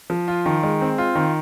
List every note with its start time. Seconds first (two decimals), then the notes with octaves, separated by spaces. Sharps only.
0.10 F3
0.28 F4
0.46 D#3
0.63 G#3
0.81 C4
0.98 F4
1.15 D#3